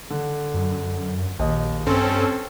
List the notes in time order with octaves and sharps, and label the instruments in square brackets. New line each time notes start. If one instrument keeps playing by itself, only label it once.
[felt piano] D3
[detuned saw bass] F#2
[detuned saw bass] A#1 [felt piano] D#2 D#5
[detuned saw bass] G2 [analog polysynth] C4 C#4 A4 [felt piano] C6